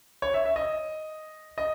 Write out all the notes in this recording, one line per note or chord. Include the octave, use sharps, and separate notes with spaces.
C#5
E5
E5
D#5
D#5